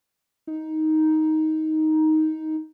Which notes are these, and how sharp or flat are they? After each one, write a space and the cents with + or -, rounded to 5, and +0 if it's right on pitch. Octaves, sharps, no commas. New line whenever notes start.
D#4 +10